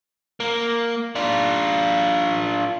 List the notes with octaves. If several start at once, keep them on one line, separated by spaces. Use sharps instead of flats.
A#3
D4 F4